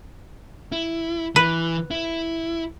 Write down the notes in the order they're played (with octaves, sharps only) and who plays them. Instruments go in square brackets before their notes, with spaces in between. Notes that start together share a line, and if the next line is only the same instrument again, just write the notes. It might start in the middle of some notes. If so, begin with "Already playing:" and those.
[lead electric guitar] E4
[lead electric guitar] E3 [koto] B4
[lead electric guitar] E4